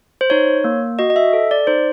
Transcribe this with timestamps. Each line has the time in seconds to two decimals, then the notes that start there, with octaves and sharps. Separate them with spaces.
0.21 C5
0.30 D#4 C#5
0.64 A#3
0.99 F#4 D#5
1.10 D#5
1.16 E5
1.33 A4
1.51 D5
1.67 D#4 C5